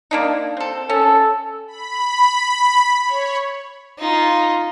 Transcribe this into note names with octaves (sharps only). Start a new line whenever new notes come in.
A#3 D4 D#4
C4 A4
C#4 A4
B5
C#5
D#4 F4